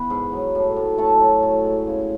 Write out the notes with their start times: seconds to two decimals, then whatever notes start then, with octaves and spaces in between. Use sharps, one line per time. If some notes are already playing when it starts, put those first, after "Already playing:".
Already playing: E3 B3 B4 B5
0.10 G#2
0.33 F#3
0.55 A2
0.76 A2
0.98 A3 A4 A5
1.20 F#3
1.43 A2
1.64 G#3
1.87 C#3